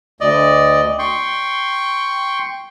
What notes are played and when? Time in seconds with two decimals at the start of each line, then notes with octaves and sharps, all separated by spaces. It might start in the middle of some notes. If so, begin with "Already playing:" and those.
0.21 D2 D5 D#5
0.99 G5 C6 C#6